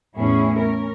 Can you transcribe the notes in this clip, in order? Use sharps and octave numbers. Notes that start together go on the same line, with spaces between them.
E2 A2 B3 C#4 E4 G#4
C#4 A#4